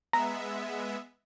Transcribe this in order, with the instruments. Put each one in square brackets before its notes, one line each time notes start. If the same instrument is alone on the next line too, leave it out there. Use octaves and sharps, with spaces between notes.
[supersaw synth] G#3 B3 E5 [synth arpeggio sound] A#5